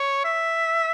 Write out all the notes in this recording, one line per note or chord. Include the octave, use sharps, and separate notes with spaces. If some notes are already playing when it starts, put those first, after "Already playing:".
Already playing: C#5
E5